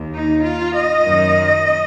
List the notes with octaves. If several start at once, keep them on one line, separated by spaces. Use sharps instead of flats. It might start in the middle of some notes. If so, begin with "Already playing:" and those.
Already playing: D#2
D#4
F4
D#5
F#2 D#3